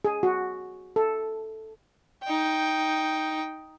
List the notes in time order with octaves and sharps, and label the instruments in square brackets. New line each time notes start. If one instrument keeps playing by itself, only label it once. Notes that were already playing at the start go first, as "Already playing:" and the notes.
[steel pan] G#4
F#4
A4
[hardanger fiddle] D#4 G5